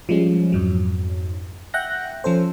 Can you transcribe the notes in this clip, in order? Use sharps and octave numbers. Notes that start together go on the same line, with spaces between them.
F3 G3 G#3 C#4
F2 G#2 F#3
E5 F#5 G5 F#6 G6 A#6
F3 C#4 A4 C5